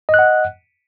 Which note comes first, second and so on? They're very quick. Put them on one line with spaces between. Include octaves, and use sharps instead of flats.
D#5 F#6 F#5